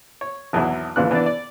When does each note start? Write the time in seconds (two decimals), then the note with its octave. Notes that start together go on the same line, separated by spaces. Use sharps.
0.21 C#5
0.53 G#1 E2 B2 F#3 E4
0.96 D#2 A#2 C#3 E3 D4 F#6
1.11 E3 B3 D4 D5
1.26 D5